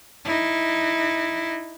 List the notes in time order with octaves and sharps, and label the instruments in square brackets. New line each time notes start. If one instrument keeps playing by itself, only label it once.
[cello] D#4 E4